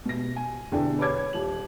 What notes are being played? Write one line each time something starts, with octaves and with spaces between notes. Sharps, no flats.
B2 A#6
G#5
E2 B2 D3 G#4 G5
B4 C#5 D6 G#6
D#1 F#7